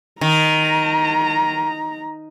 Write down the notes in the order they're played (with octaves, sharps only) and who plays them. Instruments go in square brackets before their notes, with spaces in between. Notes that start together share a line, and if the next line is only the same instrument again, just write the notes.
[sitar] D#3 [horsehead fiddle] A#5